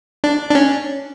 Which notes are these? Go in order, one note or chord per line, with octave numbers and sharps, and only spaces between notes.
D4
D4
C#4